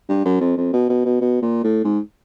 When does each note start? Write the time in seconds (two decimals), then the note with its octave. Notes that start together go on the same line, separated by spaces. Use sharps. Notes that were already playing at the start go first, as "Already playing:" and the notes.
0.09 G2
0.25 F#2
0.41 F2
0.57 F2
0.73 B2
0.89 B2
1.05 B2
1.21 B2
1.42 A#2
1.64 A2
1.85 G#2